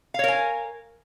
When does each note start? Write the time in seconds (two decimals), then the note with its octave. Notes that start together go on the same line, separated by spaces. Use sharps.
0.14 F5
0.19 C#5
0.24 A#4
0.28 G#5